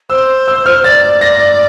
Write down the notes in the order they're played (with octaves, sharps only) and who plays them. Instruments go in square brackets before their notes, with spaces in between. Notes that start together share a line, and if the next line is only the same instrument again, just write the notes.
[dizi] C5 [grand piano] E6
[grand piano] E6
F6
[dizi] D5 [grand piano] A6
[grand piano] A#6